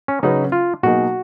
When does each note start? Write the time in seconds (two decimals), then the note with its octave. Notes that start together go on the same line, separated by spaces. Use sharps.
0.08 C#4
0.23 C#3 F#3 C#4 D#4 F#4 B4
0.52 F4
0.83 B2 F#3 A#3 D#4 F#4 G#4